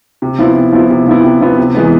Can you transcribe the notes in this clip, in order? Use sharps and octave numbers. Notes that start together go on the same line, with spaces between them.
C3
F3 B3 E4
C3
F3 B3 E4
C3
F3 B3 E4
C3
F3 B3 E4
C3
E3 G#3 B3